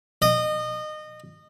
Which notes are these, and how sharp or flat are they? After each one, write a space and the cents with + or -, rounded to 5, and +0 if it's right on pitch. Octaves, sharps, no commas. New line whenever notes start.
D#5 -25